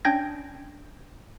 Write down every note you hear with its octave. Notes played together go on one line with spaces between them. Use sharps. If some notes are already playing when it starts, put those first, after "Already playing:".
C#4 D4 G5 G6 G#6 A#6